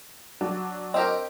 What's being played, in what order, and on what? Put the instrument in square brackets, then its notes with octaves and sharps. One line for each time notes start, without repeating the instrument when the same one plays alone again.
[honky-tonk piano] F#3 D4
[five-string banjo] C4 G4 A#4 [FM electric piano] D#5